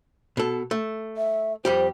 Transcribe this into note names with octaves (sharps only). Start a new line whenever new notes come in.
B2 A4
A3
E5
F2 G3 G4 C5